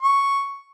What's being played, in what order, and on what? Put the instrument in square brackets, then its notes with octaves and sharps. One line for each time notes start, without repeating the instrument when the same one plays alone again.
[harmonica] C#6